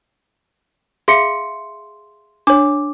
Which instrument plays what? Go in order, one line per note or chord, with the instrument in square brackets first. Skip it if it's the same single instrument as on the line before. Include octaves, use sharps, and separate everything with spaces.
[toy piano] G#4 E5 F5 [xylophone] C6 C#7
[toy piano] D4 C#5 [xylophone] D6